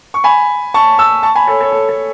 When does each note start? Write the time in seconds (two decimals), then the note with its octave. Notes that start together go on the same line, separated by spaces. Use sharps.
0.14 C#6
0.24 G#5 B5
0.74 A5 C#6
0.98 C#6 E6
1.23 A5 C#6
1.35 G#5 B5
1.47 A4 C#5
1.61 A4 C#5
1.72 A4
1.88 A4